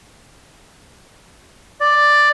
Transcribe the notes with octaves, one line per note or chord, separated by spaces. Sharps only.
D5